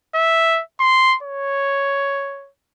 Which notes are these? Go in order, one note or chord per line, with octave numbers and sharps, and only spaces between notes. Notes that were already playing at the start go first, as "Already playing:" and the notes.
E5
C6
C#5